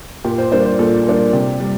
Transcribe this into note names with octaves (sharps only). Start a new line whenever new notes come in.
A#2 G4
C5
G3 A#3 D4 C5
C5
A#2 A4
G3 A#3 D4
C3 G4
G3